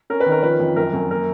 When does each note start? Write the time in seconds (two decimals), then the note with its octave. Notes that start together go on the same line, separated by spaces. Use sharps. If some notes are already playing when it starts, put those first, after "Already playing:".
0.10 C#4 A#4
0.20 B4
0.26 D#3
0.32 A#4
0.43 F3 B4
0.60 F2
0.76 F#2 A#4
0.93 F#2
1.11 A#3 A#4